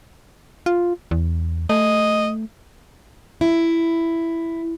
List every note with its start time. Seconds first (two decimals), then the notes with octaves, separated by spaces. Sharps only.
0.66 F4
1.11 E2
1.69 A3 D#5
3.41 E4